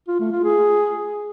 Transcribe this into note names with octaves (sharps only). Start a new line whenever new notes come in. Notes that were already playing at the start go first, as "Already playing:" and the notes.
F4
A3
F4
G#4